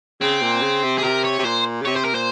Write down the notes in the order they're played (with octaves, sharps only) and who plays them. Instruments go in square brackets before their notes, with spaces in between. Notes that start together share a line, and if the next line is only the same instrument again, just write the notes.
[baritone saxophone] C#3 [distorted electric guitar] C4
[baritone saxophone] A#2
C#3
C3
[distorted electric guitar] G#4
[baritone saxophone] C3 [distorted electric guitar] A#4
[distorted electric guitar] C#5
[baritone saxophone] C3
[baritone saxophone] A#2 [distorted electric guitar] C5
[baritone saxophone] C#3
[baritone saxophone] C3 [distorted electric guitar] C#5
[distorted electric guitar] C5
A#4
[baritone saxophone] A#2 [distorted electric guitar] C5